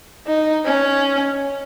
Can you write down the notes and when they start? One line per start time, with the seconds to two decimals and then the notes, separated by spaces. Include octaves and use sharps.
0.27 D#4
0.65 C#4